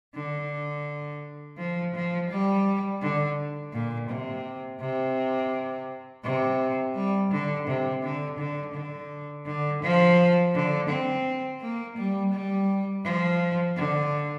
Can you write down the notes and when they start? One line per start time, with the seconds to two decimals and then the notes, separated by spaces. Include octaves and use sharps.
0.14 D3
1.57 F3
1.95 F3
2.30 G3
3.02 D3
3.73 A#2
4.09 C3
4.80 C3
6.24 C3
6.95 G3
7.32 D3
7.68 C3
8.03 D3
8.39 D3
8.74 D3
9.46 D3
9.82 F3
10.54 D3
10.89 C4
11.61 A#3
11.97 G3
12.33 G3
13.04 F3
13.76 D3